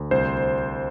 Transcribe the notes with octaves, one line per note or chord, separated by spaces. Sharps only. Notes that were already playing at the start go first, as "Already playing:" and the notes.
Already playing: D2
C2 C5